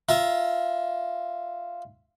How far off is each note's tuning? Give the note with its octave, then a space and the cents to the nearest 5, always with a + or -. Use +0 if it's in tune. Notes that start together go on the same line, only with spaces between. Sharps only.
F4 +0 E5 +0 A#5 +20